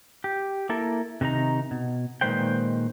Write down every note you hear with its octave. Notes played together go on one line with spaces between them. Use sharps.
G4
A#3 E4 A4 A#4
C3 D#3 D#4 A#5
B2
A#2 D#3 G#3 B4 C5 G5